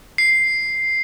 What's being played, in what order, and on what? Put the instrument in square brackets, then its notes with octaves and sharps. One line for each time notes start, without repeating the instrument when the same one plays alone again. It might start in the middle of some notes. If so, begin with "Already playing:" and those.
[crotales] C7